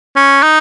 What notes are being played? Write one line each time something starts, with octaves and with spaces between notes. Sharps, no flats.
C#4
D#4